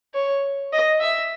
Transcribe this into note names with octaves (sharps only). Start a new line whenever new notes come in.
C#5
D#5
E5